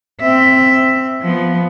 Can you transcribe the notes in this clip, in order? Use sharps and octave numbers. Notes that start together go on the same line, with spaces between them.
C4 E5
F3 B3